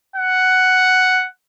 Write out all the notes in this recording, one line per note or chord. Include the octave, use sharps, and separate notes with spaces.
F#5